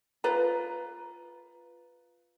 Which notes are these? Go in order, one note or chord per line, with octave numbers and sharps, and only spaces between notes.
F4 B4 A#5